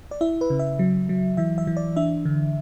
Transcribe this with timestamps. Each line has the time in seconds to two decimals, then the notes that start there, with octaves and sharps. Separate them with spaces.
0.11 D5
0.21 E4 E5
0.41 B4
0.50 C#3
0.59 E5
0.79 F#3
1.09 F#3
1.37 E3 E5
1.58 E5
1.67 E3
1.77 D5
1.96 D4 E5
2.25 D3